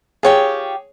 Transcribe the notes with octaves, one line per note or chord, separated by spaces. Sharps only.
F4 G4 G#4 C#5 G5